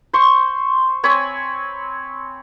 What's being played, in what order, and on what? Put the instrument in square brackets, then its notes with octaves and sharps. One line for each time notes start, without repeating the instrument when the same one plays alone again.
[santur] C5 C6 C#6
C4 C#5 G#5 B5